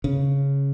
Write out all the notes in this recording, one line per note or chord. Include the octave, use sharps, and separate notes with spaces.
C#3